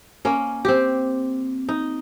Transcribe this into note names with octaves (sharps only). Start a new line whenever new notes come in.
A#3 C#4
C4 G4
D#4